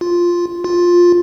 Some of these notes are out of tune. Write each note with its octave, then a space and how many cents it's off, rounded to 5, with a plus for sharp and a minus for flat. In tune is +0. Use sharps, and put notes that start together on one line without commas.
F4 +0
F4 +10